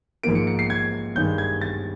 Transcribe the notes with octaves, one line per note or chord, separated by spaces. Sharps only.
G#2 F3 A#3 D7
C#7
C#7
C7
G#6
G2 D#3 G#3 G6
G#6
A6